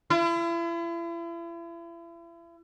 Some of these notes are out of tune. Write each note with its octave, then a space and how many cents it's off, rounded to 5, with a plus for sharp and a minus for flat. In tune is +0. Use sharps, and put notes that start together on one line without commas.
E4 +40